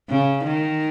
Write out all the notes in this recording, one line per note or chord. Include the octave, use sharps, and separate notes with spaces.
C#3
D#3